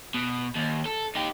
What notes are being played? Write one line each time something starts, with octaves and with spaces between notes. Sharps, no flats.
B2
D#2
A4
D#4 G4